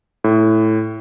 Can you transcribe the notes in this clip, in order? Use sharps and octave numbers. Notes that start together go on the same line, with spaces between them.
A2